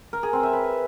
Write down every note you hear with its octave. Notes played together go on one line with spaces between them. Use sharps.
A#4
G#4
C4
E5
B4